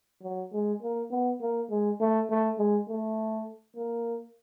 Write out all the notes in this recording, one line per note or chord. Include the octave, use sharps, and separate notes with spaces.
F#3
G#3
A#3
B3
A#3
G#3
A3
A3
G#3
A3
A#3